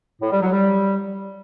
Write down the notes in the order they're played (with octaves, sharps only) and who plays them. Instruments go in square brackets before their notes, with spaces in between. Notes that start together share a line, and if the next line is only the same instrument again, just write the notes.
[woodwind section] A2
G3
F#3
G3